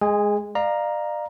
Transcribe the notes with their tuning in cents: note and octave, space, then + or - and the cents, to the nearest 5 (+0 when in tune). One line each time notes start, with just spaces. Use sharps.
G#3 +0 G#4 +0 G#5 -35
D5 +40 F5 +0 A#5 +5